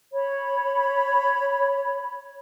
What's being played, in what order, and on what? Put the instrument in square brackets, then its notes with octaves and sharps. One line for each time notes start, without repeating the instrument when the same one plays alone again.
[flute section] C#5 B5